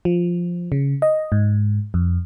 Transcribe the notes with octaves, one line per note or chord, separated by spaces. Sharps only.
F3
C#3
D#5
G#2
F2